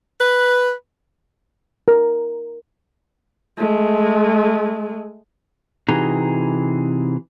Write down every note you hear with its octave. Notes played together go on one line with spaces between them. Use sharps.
B4
A#4
G#3 A3
C3 E3 D#4 F#4 G#4 A#5